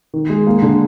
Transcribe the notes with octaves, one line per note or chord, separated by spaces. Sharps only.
D#3
G#3
A#3
D3